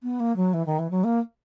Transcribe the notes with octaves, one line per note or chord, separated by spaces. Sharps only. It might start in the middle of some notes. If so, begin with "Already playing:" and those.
B3
A#3
F#3
E3
D#3
E3
F#3
A#3